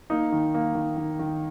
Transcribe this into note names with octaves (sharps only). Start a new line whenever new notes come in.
A#3 D#4
D#3
A#3
D#3
D#3
D#3